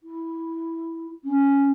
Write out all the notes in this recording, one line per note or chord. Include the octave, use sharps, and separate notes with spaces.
E4
C#4